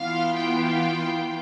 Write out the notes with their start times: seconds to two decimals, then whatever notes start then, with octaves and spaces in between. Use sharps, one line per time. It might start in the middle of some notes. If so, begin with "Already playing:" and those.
Already playing: E3 B3 F4 F5
0.39 G5